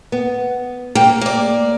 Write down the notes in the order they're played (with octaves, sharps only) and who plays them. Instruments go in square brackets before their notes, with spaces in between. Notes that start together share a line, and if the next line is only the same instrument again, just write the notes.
[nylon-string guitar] B3
[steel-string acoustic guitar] A#3 [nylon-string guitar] G5
[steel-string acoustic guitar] A#3 D5